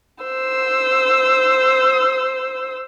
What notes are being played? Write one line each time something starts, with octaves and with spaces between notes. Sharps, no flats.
C5 E6